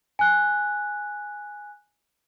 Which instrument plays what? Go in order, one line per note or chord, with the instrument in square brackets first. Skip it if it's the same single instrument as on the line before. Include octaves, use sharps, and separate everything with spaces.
[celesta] G#5 F#6